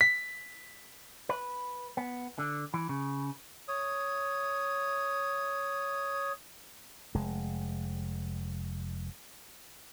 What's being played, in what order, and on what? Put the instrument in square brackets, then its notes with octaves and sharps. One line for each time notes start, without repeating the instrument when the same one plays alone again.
[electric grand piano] B6
[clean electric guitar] B4
B3
D3
E3
C#3
[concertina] C#5 D#6
[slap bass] F1 G#3